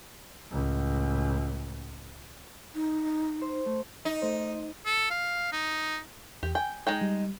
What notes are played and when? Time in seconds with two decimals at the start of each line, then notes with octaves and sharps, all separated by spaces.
0.49 C#2 A2
2.75 D#4
3.41 C5
3.65 A3
4.05 D#4
4.22 A3 C5
4.86 A4
5.11 F5
5.52 D#4
6.43 E2 G4
6.55 G5 G#5
6.87 G#3 D#4 G5
7.01 G3